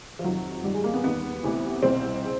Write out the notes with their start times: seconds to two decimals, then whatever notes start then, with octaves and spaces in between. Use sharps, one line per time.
0.19 F3
0.24 F2 C3 D#3 F#3
0.63 G2 D#3 G3
0.74 G#3
0.84 A#3
0.94 B3
1.04 D#2 D#3 B3
1.43 D2 C3 E3
1.83 C2 B2 C4
2.24 C#3